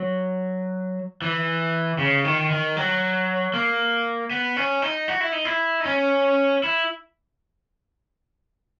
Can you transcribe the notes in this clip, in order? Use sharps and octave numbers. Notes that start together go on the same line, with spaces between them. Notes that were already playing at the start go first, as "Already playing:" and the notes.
Already playing: F#3
E3
C#3
D#3
D#3
F#3
A#3
B3
C#4
D#4
F#4
E4
D#4
E4
D#4
C#4
E4